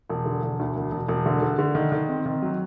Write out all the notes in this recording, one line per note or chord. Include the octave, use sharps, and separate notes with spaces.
E1
D3
E1
D2
E1
E1
E1
D3
D3
D3
D#3
D#3
C4
D#3
F#3